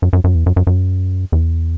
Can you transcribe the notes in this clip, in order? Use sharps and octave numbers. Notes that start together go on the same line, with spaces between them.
F#2
F#2
F#2
E2
F#2
F#2
F#2
E2